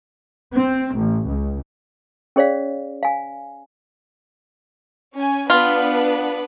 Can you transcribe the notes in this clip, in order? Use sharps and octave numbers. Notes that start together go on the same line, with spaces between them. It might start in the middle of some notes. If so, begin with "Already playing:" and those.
C4
A1
C#2
C#4 G#4 C#5 D5 F5
F5 G#5
C#4 G#5
B3 D4 F4 B4